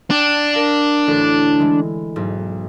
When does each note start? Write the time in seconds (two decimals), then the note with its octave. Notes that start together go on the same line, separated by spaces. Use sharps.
0.10 D4 G5
0.53 A#4 F5
1.07 A1 D2
1.59 E3 G#3
2.16 B1 G#2